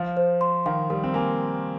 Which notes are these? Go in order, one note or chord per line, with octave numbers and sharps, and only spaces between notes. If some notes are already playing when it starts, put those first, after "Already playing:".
Already playing: F3 F5
C5
C6
D#3 F5
G3 A#4
C4
A#3 G#5